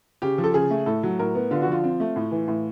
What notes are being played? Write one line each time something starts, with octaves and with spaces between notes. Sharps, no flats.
C#3 G4
F3
A4
C#3 G#4
A3
A2 A4
F#3
A2 A#4
B3
D3 F4
F#4
F3 F4
C4
A3
A2
E3
A2